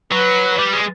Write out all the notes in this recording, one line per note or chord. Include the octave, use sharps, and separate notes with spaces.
F#3 B4
G3
G#3